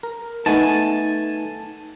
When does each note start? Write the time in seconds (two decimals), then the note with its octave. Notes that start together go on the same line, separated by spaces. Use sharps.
0.03 A#4
0.46 A3 B3 D#4 G#5 A5